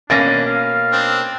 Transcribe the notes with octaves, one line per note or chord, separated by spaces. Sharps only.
B2 A#3 C#4 D4 A6 A#6
F5
C4 D4